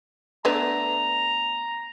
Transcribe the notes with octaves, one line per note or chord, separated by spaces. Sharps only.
A3 B3 D4 A#5